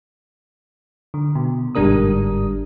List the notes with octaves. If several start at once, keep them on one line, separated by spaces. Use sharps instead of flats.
D3
B2
G1 G#2 G3 D4 A#4 D#6